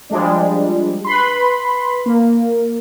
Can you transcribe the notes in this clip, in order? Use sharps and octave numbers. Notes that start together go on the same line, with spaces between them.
F3 G3 G#3 D4
B4 B5 C6
A#3